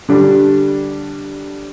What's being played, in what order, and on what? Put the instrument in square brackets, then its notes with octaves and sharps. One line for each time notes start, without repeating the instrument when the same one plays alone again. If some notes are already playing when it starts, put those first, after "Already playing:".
[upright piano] D3 G3 D4